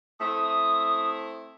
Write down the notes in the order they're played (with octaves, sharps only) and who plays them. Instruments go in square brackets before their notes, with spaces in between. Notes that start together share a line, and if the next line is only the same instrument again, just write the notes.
[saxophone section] A3 C4 E4 [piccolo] D#6